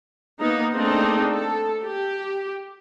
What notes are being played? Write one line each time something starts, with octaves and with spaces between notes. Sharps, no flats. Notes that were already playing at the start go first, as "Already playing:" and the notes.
A#3 B3 D#4
A3 A#3 C4 D4 D#4 G#4
A4
G4